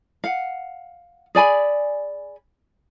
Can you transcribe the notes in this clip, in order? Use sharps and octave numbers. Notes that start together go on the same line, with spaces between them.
F5 F#5
G#4 D5 G#5 B5